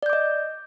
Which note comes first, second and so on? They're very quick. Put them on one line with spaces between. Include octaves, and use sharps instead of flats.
D5 G6 D6 D#5